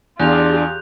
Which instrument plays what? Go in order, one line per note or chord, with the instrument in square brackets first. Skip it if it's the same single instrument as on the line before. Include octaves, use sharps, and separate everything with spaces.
[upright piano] E2 [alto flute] D4 [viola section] F4 G4 G#4 [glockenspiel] F#6 G6 F7